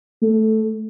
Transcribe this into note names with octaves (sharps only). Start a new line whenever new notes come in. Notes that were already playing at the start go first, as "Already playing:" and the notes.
A3